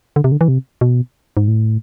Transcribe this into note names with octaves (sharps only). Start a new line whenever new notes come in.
D3
C3
D3
E3
C3
B2
G#2
A2